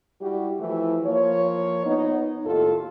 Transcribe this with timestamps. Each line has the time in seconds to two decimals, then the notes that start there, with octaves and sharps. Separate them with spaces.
0.21 G3 E4 F#4 G4
0.60 E3 F3 A3 E4
1.05 F3 A#3 C#5
1.86 B3 D#4
2.45 D#2 A2 F4 A4